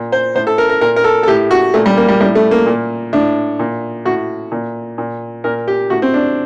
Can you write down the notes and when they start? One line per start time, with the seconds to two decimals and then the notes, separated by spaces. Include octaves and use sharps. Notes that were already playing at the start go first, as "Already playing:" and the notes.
Already playing: A#2
0.12 C5
0.35 A2 C5
0.47 A4
0.58 A#4
0.69 A#4
0.81 A#2 A#4
0.96 A#4
1.04 A4
1.23 A4
1.28 A2 G4
1.51 F#4
1.74 A#2 A3
1.86 G3
1.97 A#3
2.08 G3
2.20 A2 G3
2.35 A3
2.51 A#3
2.66 A#2
3.13 A2 D4
3.59 A#2
4.05 A2 F#4
4.52 A#2
4.98 A#2
5.44 A#2 A#4
5.68 G4
5.90 A2 F#4
6.02 C4
6.14 D4